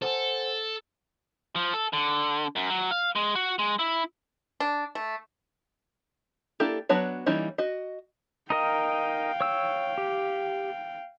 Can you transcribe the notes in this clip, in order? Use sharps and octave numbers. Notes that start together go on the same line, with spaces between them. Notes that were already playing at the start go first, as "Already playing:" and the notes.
A4 C5 F#5 G#5
F3
A4
D3
F#2
F#3
F5
G#3
F#4
G#3
E4
D4
A3
A#3 D4 E4 G4 A4
F#3 B3 D4 F#4 C#5
E3 G3 A#3 C#4 D#4
F#4 D#5
D#4 A#4 D#5 F5 G5
C#5 E6
G4